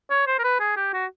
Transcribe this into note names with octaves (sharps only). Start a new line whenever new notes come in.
C#5
C5
A#4
B4
G#4
G4
F#4